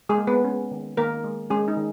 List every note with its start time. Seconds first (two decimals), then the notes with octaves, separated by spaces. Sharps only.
0.09 G#3 G#4
0.18 A#3
0.27 B3 B4
0.44 C#4
0.71 D#3
0.97 D#3 A#3 A#4
1.24 G#3
1.50 G#3 C#4 G#4
1.68 D#4
1.76 D#3